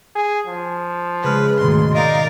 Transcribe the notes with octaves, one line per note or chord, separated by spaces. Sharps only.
G#4
F3
C#3 G#3 B4 F6
D2 G#2 B2 D#3 C6
D#4 A#4 D5 D#5 F5